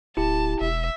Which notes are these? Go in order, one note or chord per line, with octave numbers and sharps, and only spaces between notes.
D1 E4 G4 A5
E1 E5